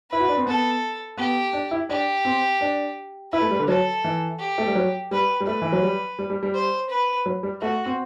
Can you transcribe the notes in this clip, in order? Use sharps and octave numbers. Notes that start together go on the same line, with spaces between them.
E4 B4
F#4
D4
C4
B3 A4
B3 G4
D4
E4
D4 G4
C4
D4
E4 B4
A3
G3
D3
F#3 A4
E3
G4
A3
G3
F#3
G3 B4
G3
A3 B4
E3
F#3
G3
G3
G3
G3
C5
B4
F#3
G3
A3 F#4
C4